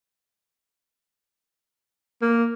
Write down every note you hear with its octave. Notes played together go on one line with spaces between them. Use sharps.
A#3